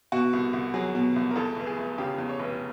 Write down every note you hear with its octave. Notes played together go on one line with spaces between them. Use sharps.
B2 F#4
C2
C2
F#3 G#4
B2
C2
A#4
E2 A4
F1
G#4
F1
C#3 G4
E2
C#5
F1